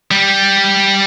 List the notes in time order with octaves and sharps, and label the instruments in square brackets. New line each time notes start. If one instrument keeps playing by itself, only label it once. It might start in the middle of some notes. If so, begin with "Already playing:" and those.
[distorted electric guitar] G3